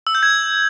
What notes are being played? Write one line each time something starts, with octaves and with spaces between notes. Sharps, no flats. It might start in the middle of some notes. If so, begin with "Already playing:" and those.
E6
G6
G#6